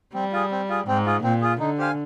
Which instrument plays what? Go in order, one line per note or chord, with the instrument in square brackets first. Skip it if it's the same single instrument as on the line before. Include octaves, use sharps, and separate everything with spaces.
[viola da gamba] G3 [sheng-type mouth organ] C4
[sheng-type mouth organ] F4 G#4
C4
F4 G#4
[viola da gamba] G#2 [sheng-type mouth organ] C4
[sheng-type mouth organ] F4 G#4
[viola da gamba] A#2 [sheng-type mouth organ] C4
[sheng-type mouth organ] F4 G#4
[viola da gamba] D3 [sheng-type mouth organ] D#4
[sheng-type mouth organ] G4 C5 F5 G#5